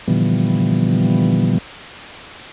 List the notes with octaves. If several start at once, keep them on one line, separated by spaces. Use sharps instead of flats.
A#2 D3 E3 F3 G3 B3